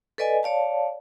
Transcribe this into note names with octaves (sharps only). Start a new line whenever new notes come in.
A4 B4 D5 D#5 G#5
C#5 D5 F5 A5